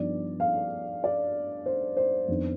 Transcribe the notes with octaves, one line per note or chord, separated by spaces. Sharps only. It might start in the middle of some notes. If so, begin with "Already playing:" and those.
Already playing: G2 F3 B3 D#4 D5
F5
D5
C5
C5
F2 D#3 B3 D4